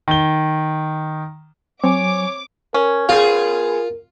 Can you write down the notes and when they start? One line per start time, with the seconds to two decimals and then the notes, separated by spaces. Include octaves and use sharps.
0.08 D#3 G7
1.84 F#3 C4 C#5 G#5 D6
2.74 C#4 A#4
3.09 B3 F4 G#4 A#4